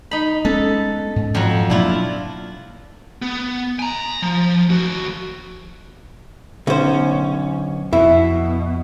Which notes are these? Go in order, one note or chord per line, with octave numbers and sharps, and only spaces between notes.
D#4 B5
G#3 B3 C#4 A4
G#2
F2 F#3
B2 F#3 A#3 D4 E4 F4
B3
G#5 A#5
F3
D#2 F#4
B1 D3 C#4 C5
F2 B2 E4